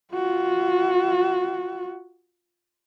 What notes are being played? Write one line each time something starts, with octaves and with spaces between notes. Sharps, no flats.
F4 F#4